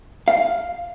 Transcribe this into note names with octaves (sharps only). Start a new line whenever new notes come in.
F5